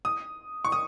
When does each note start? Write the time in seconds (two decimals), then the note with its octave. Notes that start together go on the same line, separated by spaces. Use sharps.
0.05 D#6
0.65 C#6
0.72 D#6